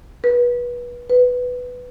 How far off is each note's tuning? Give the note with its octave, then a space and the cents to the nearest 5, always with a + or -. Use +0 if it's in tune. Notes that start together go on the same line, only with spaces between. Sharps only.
B4 -25
B4 +5